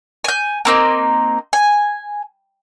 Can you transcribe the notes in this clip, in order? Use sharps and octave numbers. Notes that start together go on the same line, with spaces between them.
G#5 G6
A#3 C4 D#4
G#5